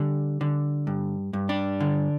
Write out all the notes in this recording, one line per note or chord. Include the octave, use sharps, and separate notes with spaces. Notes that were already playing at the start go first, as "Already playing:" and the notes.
Already playing: D3 G3
D3
G2
G2
D4
D3